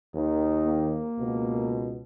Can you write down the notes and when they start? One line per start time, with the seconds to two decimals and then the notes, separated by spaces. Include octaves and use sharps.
0.13 D#2 D#3
0.65 A#3
1.18 C#2 B2